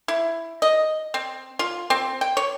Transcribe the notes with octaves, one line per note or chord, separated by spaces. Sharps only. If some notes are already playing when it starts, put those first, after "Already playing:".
E4
D#5
C4
F4
C4
G5
C#5